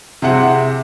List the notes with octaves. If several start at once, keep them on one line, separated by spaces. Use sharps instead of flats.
C3 C4 E4 G#4 F#5